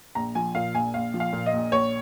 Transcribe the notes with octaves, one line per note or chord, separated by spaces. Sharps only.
A#1 A#5
F3 G#5
A#2 F5
A#1 G#5
A#1 F5
F3
F5
A#2
D#5
A#1
A#1 C#5